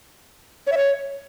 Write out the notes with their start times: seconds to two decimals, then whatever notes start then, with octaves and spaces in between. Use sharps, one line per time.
0.67 C#5
0.72 E5
0.77 C#5